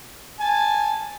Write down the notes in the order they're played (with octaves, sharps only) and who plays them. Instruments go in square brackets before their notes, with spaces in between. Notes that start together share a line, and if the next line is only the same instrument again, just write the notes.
[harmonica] G#5 A5